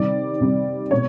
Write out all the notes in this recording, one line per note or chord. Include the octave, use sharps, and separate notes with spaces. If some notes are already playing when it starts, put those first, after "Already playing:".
Already playing: C3 D#3 G3 C4 D5
C3 D#3 G3 C4
B2 G#3 C4 C#5